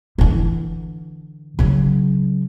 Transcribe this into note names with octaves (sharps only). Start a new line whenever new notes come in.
D3 E3
C#3 F#3